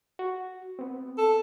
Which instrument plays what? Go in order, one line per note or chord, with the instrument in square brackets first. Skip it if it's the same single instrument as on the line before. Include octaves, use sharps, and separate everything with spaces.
[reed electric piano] F#4
B3 C4
[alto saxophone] A4